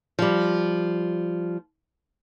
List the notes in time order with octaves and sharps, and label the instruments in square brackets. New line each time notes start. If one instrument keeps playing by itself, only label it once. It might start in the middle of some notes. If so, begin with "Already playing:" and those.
[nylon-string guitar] F3 G3